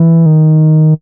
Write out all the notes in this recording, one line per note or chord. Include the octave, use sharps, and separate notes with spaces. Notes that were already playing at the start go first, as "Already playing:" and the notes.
Already playing: E3
D#3